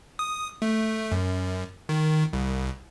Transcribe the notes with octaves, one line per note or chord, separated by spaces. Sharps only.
D#6
A3
F#2
D#3
C2